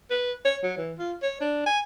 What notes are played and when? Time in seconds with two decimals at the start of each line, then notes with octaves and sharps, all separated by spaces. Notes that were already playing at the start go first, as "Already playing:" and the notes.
0.10 B4
0.45 C#5
0.63 F#3
0.78 E3
0.98 F4
1.22 C#5
1.40 D4
1.66 G#5